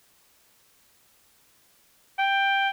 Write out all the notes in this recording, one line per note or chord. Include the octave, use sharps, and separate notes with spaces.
G5